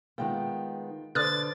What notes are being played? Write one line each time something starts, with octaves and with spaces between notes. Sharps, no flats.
D#3 G#3 B3 F4 G5
D3 B4 C5 D5 D#6 F6 F#6 A6